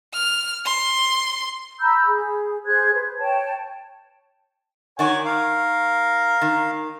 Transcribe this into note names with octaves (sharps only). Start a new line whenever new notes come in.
F6
C6
A#5 B5 E6 G6
G#4
G#4 C5 F#6 G#6
B4 C5
C#5 G5 A5
D#3 F#4 C#5 D5 G#5
A#4 F5
D#3